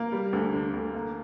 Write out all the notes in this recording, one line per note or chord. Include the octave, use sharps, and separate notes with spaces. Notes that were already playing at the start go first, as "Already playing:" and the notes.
Already playing: A#3
G3
D2
D3
D2
A#3